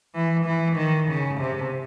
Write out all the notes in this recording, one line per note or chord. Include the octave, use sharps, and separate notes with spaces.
E3
E3
D#3
C#3
C3